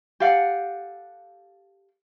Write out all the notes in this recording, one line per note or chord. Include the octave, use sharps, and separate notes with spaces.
G4 A4 F5 F#5